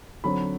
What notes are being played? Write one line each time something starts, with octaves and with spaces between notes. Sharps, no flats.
D3 F#3 C4 B5